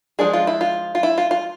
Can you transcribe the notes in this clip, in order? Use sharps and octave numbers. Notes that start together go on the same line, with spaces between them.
F3 G#3 D4 G#4
F4
E4
F4
F4
E4
F4
F4